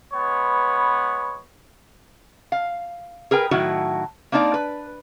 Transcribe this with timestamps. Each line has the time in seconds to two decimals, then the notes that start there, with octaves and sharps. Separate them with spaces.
0.14 G#3 B3 B4 C#5
2.52 F5
3.31 G#4 A#4 B4 G5
3.51 A2 D#3 F#3 E4 F#4
4.32 A#3 C4 D4 D#4 D5
4.54 B4